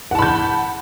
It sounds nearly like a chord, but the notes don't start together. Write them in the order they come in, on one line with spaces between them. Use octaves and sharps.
F#5 A5 B5 G6